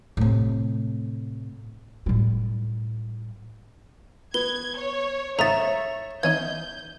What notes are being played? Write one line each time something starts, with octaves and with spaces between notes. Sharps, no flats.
A2 C3
A2 G3
B3 G#6 G7
C#5
G#2 C#3 C#5 E5 A#5 D#6 A6
E3 C#4 D#4 G6 G#6